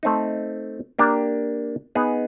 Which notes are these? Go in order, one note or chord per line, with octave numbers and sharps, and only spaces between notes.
A3 C4 D#4
A#3 D4 G4 A#4
B3 D#4 G#4